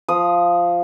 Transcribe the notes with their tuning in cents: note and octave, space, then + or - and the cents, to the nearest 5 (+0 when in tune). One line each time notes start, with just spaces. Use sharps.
F3 -5 D#6 +0